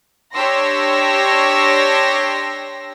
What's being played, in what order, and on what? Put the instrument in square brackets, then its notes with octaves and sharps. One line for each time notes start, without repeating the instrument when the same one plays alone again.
[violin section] D4 G4 C#5 C6 E6 A#6